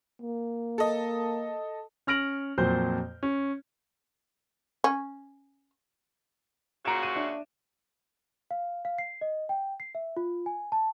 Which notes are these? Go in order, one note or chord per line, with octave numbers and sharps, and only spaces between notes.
A#3
A4 D#5
C#4 F6 A#6 D7 F#7
F2 A#2 F#3 C5 G6
C#4
C#4
A#2 C#3 F#4 A#5 D7 E7
D#7
D4 E5
F5
F5
C7
D#5
G5
C7
E5
F4
G#5
A5